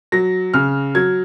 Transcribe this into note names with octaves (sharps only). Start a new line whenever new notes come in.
F#3 A#6
C#3 F6
F#3 G#6